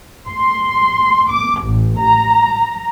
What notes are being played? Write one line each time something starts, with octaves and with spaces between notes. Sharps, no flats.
C6
D6
A1
A#5